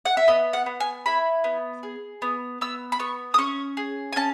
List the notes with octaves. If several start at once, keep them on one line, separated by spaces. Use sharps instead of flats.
F#5
E5
B3 D#5
F#5
B3
G#5
E4 B5
B3
G#4
B3
B3 E6
B5
B3 C#6
D#6
C#4 C#6
G#4
G#5
C#4 A5